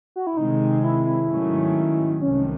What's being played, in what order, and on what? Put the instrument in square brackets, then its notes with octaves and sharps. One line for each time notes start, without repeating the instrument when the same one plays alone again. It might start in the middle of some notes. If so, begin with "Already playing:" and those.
[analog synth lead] F#4
E4
[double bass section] C3 D#3 G#3 C4 [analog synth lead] D#4
[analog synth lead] E4
E4
[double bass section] G#2 D#3 F#3 A3 C#4
[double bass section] C2 C3 D#3 A3 [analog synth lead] C#4